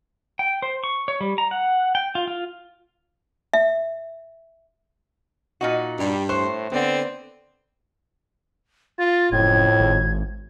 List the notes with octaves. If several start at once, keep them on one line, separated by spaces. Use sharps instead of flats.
G5
C5
C#6
C#5
G3
A#5
F#5
G5
F4
F4
E5
A#2 D#4 F#4
G2 G3 D5
A2 C5 C#6 F#6
D3 B3 C4 D5 F#5
F4 A6
F#1 F2 A2 G#6
G#1